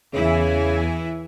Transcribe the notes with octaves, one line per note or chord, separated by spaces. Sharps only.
E2 C#3 E3 E4 G#5